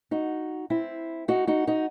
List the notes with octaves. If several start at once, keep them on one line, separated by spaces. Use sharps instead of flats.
D#4 F#4
C4 E4
D#4 F#4
D#4 F#4
D#4 F#4